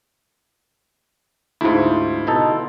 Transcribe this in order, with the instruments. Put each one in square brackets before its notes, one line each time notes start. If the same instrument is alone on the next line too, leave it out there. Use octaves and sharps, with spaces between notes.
[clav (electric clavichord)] D2 G#2 [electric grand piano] E4 F4
[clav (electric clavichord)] B2 D#4 A4